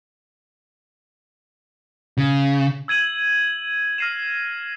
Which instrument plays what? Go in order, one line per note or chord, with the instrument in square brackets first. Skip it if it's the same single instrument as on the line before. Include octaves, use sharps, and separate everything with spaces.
[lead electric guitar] C#3
[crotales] E6 G#6 D#7 F#7
F6 A#6 C7 D#7 E7